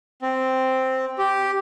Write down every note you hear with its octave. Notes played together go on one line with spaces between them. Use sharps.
C4
G4